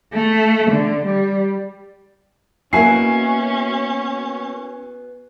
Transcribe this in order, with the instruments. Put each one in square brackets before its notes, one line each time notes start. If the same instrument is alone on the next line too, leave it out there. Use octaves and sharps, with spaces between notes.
[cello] A3
D3
G3
[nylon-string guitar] A#3 E4 [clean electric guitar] B3 F#4 [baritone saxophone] C#4 [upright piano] G#5 C7